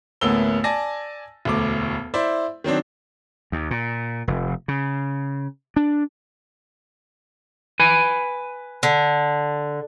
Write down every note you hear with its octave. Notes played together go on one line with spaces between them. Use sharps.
A1 D2 A#3 B3 E6 G7
D5 G#5 A5 A#6
E1 D2 D6
E4 C5 D5 E5
D#3 F#3 C4 D4
D#2
A#2
F1
C#3
D4
B4 G#5
D3